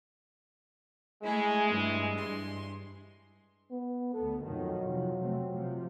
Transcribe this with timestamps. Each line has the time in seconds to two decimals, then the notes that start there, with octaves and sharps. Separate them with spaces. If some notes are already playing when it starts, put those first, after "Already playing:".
1.22 G#3 A3 E4 G#4
1.67 G2 E3
2.18 G2 C6
3.71 B3
4.14 D2 B3 A4
4.44 F2 B2 D#3 F#3
4.87 C3 F3
5.19 C3 A3 C4
5.49 C3 F3